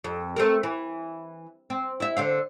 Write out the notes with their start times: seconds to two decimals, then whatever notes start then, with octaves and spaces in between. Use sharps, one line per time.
0.04 F2
0.36 A3 C4 A#4
0.63 E3
1.70 C4
2.00 E4 E5
2.17 D3 C5 F5